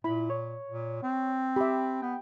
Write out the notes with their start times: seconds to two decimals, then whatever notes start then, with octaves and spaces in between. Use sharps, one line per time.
0.04 A#2 E4 B5
0.30 C#5
0.68 A#2
1.03 C4
1.56 G4 E5 B5
2.02 B3 G5